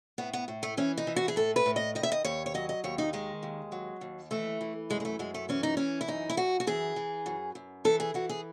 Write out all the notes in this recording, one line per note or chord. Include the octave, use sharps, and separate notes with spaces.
A2 B3
B3
A2
A3
E3 C#4
D#4
E3
F#4
G#4
A2 A4
B4
A2
D#5
D#3 D#5
E5
D#5
D#2 C#5
C#5
F#3 D#5
D#5
D#2 C#5
D#4
D#3 G#3
D#2
F#3
D#2
E3 A3
E3
F#2 G#3
G#3
A3
F#2 G#3
A3
E3 C#4
D#4
E3 C#4
E4
F#2 D#4
E4
F#2 F#4
F#4
E3 G#4
E3
F#2
F#2
E3 A4
G#4
E3 F#4
G#4